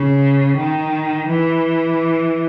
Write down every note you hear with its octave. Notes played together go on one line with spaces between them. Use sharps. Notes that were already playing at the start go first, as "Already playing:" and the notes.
Already playing: C#3
D#3
E3